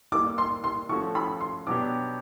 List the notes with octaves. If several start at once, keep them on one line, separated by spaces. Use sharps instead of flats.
G3 A#3 D#4 D6
C6
C6
F3 A3 C#4 F#4 C#6
B5
C6
B2 F#3 B3 D4 G4 D6